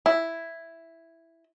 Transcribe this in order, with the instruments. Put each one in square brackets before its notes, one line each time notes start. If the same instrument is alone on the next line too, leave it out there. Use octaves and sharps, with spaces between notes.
[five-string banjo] E4